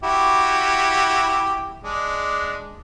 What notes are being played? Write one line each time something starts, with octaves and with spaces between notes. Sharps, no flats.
E4 F#4 G4
G#3 D4